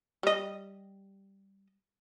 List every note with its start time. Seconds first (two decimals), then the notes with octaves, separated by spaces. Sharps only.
0.23 G3 D#5